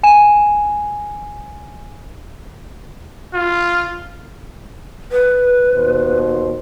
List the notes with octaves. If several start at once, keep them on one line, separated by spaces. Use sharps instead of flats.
G#5 E7
F4
B4
D#2 B2 C5